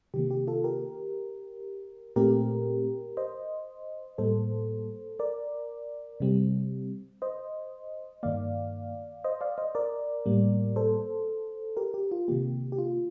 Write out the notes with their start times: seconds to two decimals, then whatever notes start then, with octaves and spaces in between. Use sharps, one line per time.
0.14 C3 D#3 A#3 G4
0.31 G4
0.47 F4 A4
0.64 G4 A#4
2.16 A#2 A3 C4 G4 A#4
3.17 C5 D#5
4.18 A2 G3 A#3 A4 C5
5.19 A#4 D5
6.20 C3 G3 C4
7.22 C5 D#5
8.23 G2 D#3 A#3 D5 F5
9.24 C5 D#5
9.41 D5 F5
9.58 C5 D#5
9.75 A#4 D5
10.26 A2 G3 A#3
10.76 A4 C5
11.77 G4 A#4
11.94 G4
12.11 F4
12.28 C3 D#3 A#3 G4
12.72 G4
12.78 F4